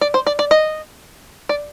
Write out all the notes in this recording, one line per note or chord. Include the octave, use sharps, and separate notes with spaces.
D5
C5
D5
D5
D#5
D5